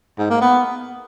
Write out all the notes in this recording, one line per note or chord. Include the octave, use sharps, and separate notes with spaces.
G#2
A#3
B3